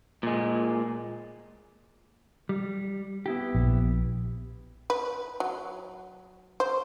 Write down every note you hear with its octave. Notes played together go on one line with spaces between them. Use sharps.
A#2 G#3
G3
B3 E4 G4
A#1
B4
F#3
C5